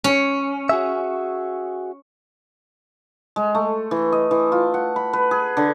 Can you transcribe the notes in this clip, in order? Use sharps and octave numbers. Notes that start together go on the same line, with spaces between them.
C#4
F#4 G#4 E5
G#3
A3
E3
D#5
E3
F4
F#5
B5
B4
G#4
D3